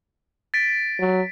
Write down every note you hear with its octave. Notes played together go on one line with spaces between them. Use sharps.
A6 B6 D7
F#3